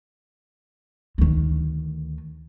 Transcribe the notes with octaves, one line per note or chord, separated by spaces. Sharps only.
D2 D#3